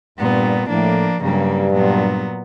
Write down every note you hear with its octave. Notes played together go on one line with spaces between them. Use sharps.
G2 A#2 G3 B3
A2 F3 A#3 D4
G2 C#3 F#3 A#3
A#2 F#3 B3